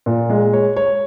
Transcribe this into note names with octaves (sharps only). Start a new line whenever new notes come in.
A#2
G#3
C#5
C#5